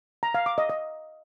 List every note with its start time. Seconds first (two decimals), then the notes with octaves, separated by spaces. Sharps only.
0.23 A#5
0.34 F5
0.46 D6
0.58 D#5
0.70 D#5